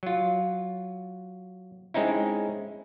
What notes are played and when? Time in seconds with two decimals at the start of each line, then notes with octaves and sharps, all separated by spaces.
0.03 F#3 F4
1.94 G#3 C4 C#4 D#4 E4